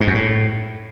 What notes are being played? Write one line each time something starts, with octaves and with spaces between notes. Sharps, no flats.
G#2
F#2
A2